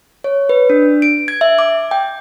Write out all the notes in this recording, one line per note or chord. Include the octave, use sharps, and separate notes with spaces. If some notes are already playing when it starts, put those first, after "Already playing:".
C#5
B4
D4
D7
G#6
E5
D6
G5